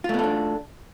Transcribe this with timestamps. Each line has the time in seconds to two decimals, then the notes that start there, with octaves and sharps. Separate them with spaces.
0.04 F4
0.09 A3
0.14 B3
0.19 A4
0.23 D4